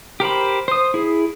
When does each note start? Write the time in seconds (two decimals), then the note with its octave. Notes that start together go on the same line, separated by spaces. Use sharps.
0.20 G4 A#4 C5 B5
0.68 C5 D#6
0.94 E4 G#4